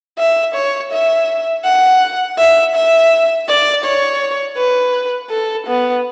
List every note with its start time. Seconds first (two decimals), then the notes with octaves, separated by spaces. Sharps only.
0.19 E5
0.55 C#5
0.93 E5
1.65 F#5
2.38 E5
2.76 E5
3.49 D5
3.85 C#5
4.57 B4
5.31 A4
5.68 B3